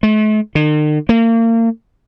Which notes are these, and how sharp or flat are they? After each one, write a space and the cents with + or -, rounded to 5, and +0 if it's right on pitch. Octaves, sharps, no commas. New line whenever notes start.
A3 -45
D#3 -45
A#3 -35